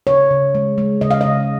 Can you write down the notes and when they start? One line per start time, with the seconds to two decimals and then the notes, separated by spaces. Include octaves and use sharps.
0.07 C#3 C#5
0.31 C#3
0.55 G#3
0.78 G#3
1.01 C#3 D#5
1.11 F5
1.21 C#3 D#5